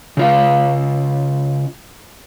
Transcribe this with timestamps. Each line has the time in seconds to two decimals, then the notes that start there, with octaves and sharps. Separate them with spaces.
0.17 C#3 F4 F5